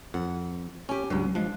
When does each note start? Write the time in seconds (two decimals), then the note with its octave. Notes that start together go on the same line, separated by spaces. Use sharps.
0.14 F2 F#5
0.89 C#4 G4 G#5
1.10 C#2 G2 F#3
1.35 F3 G#3 D4